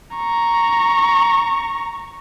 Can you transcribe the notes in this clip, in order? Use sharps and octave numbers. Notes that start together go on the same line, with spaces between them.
A#5 C#6